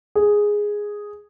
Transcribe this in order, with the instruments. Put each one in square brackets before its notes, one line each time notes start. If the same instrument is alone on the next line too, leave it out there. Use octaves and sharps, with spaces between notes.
[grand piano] G#4